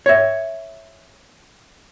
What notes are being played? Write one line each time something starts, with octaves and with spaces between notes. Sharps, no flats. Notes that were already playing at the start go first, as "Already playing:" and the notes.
C#5 E5